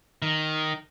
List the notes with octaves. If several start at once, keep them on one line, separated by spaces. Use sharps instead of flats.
D#3